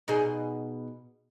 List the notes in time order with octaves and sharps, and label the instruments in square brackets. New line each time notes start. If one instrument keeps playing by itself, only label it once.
[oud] B2 D#4 G#4